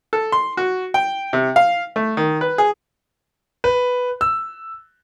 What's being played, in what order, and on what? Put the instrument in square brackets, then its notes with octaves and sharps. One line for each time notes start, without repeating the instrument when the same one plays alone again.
[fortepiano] A4
C6
F#4
G5
C3
F5
A3
D#3
B4
G#4
[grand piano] B4
E6